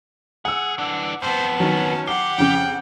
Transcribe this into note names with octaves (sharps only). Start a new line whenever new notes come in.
G#4 F#5 E6
E3 D4
F2 B3 C5 A5
D#3 F#3 C#4
G4 F#5 C7
F2 C#3 G5